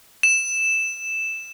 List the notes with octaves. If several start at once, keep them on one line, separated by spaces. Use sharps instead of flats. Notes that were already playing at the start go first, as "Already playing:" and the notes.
E7